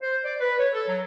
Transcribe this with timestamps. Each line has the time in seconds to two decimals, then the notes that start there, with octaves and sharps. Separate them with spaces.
0.02 C5
0.24 D5
0.41 B4
0.58 C#5
0.73 A4
0.88 F#3